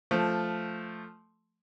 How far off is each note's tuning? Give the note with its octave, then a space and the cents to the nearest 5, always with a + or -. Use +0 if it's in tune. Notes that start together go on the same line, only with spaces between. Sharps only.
F3 +0 A3 +0